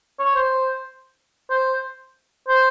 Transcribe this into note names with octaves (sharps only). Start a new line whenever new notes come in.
C#5
C5
C5
C5